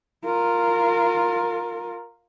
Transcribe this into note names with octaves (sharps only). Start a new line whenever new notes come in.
F4 A#4